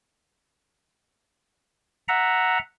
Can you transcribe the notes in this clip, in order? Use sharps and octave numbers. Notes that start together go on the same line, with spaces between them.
E5 F#5 A#5